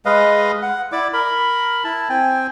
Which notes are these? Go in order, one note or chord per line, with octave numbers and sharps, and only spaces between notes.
G#3 B4 D#5 F5
F#5
E4 D5 D6
A#4 B5
E4 A5
C4 G5 G#5